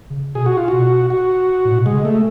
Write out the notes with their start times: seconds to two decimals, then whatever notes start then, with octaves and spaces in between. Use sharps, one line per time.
0.10 C#3
0.35 B2 G#4
0.46 F#4
0.57 F4
0.68 B2 F#4
1.10 F#4
1.65 A2
1.75 B2
1.86 C#3 G#3
2.05 A3